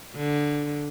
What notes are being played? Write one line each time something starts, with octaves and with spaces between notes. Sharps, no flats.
D3